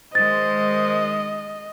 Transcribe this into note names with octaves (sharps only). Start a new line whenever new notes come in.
D#3 G#3 C5 D#5 A6